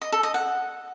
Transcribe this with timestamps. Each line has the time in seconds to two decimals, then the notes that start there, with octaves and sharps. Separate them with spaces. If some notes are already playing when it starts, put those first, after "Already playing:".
0.02 D#5
0.12 A4
0.23 D#5
0.34 F#5